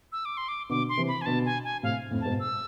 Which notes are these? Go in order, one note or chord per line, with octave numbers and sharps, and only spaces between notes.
E6
D6
C6
D6
B2 D3 D6
C6
C3 E3
B5
G#5
B2 D3 A5
G#5
G#5
A2 C3 F5
F2 A2
G#2 B2 A5
E6